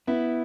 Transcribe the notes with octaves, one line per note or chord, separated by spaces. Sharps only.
B3 E4